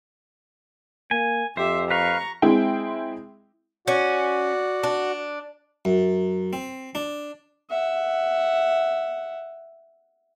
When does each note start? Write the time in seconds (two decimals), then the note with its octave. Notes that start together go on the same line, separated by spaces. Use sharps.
1.11 A#3 G#5
1.57 F2 G4 C5 E5
1.91 B4 F5 A#5 C#6
2.42 G#3 C4 E4 G#4 E5 G5
3.87 C#4 F#4 D5 F#5
4.83 D4
5.85 F#2
6.53 C4
6.95 D4
7.70 E5 F#5